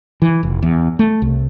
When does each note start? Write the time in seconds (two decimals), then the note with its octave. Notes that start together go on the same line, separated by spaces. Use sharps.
0.22 E3
0.43 F1
0.63 E2
0.99 A3
1.22 C2